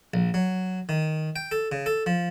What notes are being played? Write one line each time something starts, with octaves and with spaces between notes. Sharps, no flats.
A#1
F#3
D#3
G5
A4
C#3
A4
F3